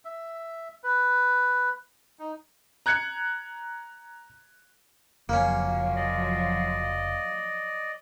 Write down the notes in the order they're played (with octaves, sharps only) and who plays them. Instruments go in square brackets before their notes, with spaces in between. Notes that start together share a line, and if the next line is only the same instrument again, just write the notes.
[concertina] E5
B4
D#4
[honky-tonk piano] A#5 F#6 G#6 C#7
[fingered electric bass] F1 F2 C#3 [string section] F3 F#3 [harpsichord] A#3 C#4
[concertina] D5 D#5